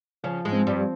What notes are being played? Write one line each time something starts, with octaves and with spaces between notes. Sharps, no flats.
C#3 F3 C#4
G#2 G#3
C4
G2 G3